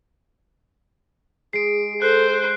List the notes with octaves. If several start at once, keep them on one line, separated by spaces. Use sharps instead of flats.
G#3 G#4 C7 D7
A4 C5 F#6 C7